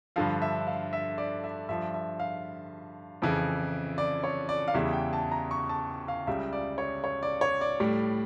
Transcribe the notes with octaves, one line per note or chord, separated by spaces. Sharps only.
G2 D3 F3 F5
E5
F5
E5
D5
E5
G2 F3 E5
E5
F5
F2 C#3 E3
D5
C#5
D5
F5
E2 C#3 E3 G3 E5
G5
A5
A#5
C#6
A5
F5
C#2 C#3 G3 E5
D5
C#5
C#5
D5
C#5
D5
A2 G3